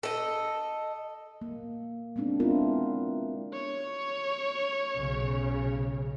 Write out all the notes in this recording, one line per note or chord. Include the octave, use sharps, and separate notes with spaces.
A4 D#5
A#3
G#3 B3 C4 D4 D#4
B3 C4 D4 E4 F4 A#4
C#5
B1 C#3